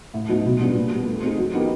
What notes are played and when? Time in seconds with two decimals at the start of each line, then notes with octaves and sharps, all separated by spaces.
0.14 A2
0.29 F#3 B3 D#4
0.45 B2
0.60 G3 B3 D4 F4
0.76 A#2
0.91 G3 B3
1.07 A3
1.23 C4 D#4 G#4
1.38 F#3
1.54 B3 D#4 G4 A#4